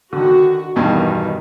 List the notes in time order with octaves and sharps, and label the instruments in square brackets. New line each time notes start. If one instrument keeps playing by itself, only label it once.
[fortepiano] D3 D#3 [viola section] F#4
[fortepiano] E2 G2 B2 [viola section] D#3